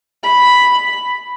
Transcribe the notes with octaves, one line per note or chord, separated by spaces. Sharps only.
B5